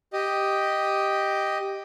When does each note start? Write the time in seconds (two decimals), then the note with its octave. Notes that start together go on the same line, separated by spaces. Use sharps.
0.13 G4 D#5